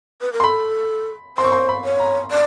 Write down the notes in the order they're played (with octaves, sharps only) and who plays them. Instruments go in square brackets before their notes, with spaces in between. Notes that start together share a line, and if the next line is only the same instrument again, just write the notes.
[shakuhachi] B4
A#4
[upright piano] C6
[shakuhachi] A4 [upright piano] B5
[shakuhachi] C5 [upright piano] C6
[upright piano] C#6
C6
B5
[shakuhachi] C#5
[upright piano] A#5
[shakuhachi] D5